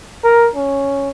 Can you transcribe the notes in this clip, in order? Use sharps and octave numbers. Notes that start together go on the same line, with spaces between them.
A#4
C#4